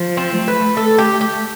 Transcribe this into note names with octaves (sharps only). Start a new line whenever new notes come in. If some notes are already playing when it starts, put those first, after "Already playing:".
Already playing: F3
C4
A3
B4
A4
G4
G4